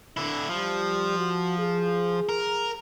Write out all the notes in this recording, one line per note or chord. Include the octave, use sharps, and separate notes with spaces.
D3 D4 E4
F3 G3
F#4
G#4
A#4